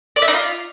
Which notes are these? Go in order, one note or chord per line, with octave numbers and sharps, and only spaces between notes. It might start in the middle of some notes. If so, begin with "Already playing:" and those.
D5
E5
D#4
F4